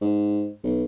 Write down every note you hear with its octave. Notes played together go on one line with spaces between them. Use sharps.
G#2
B1